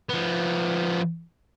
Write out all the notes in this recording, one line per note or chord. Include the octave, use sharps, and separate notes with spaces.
F3 B3